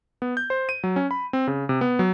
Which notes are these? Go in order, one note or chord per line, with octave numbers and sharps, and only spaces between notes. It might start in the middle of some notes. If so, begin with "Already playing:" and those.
B3
G6
C5
D#7
F#3
C#4
B5
C4
C#3
C3
B3
F#3